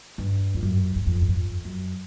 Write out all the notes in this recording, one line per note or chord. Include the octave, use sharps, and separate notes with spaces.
G2
F2
F#2
F#2
F2
G2
F#2
F2
F#2